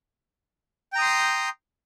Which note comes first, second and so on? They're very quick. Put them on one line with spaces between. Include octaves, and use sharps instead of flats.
G5 A#5 D#6 C6 G6